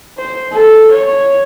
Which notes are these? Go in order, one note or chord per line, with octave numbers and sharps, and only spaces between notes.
C5
A4
C#5